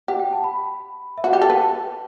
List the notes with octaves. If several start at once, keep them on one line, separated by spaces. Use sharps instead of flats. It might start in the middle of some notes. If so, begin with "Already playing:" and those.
G4 F#5
G5
A5
B5
E5
F#4
F#5
G4
A4 G5
B4 A5